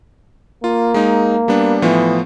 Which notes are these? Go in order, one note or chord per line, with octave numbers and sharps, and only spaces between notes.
A#3 F4
G#3 D#4
G3 B3 D4
A2 E3 F3 B3